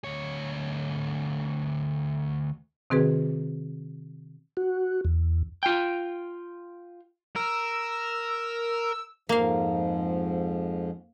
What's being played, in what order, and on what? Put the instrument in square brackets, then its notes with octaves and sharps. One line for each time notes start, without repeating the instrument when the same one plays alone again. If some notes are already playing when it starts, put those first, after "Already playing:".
[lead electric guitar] D2 C#5
[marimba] C3 D#3 C4 F#4 G#4 B4
[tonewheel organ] F#4
E2
[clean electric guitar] F4 G5
[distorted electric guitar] A#4 [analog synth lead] E6
[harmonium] F2 G#2 F3 [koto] A#3 F5